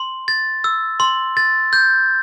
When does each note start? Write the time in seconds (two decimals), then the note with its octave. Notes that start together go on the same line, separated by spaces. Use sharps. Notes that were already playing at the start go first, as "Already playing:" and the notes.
Already playing: C6
0.28 A6
0.64 E6
1.00 C6
1.37 A6
1.73 G6